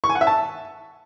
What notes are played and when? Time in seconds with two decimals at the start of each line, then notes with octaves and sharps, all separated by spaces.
0.04 C#6
0.09 G#5
0.15 F#5
0.21 E5
0.27 A5